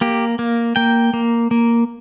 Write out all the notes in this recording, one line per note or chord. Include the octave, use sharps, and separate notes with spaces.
A#3 G4
A#3
A#3 G5
A#3
A#3